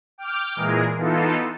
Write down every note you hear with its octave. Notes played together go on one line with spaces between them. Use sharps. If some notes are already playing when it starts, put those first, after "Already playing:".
G5 D6 F6
A#2 E3 G#3 G#4 A#4
E3 B3 D#4 F4 A4